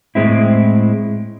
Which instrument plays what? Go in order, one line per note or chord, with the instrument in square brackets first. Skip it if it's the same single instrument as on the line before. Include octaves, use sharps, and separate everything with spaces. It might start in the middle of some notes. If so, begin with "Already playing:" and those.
[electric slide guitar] A2 G#3 C4 E4